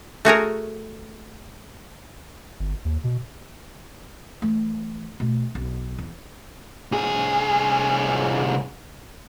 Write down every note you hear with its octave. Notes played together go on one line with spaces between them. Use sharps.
A3 F#4 G#4 A#4
G1
D#2
B2
E3 A3
B2 A3
B1
E2
C2 G#4